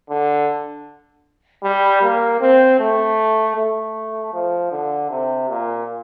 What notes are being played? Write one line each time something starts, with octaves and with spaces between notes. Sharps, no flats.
D3
G3
A#3
C4
A3
A3
F3
D3
C3
A#2